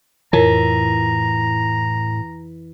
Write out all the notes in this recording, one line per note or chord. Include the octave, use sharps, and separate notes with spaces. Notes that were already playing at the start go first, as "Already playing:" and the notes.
F2 A2 E3 A#4 C#5 A#5